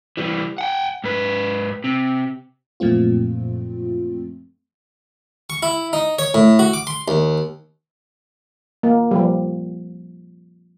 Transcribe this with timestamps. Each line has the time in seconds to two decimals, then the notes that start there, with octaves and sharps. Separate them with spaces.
0.17 E3 G3
0.58 F#5 G5
1.04 G#2 B4
1.84 C3
2.80 F#2 A#2 F3 A3 C4 F4
5.50 C#6
5.63 E4
5.93 D#4
6.19 C#5
6.34 A2
6.59 F#4
6.74 D6
6.87 C6
7.08 D#2
8.83 A#3
9.11 F3 G3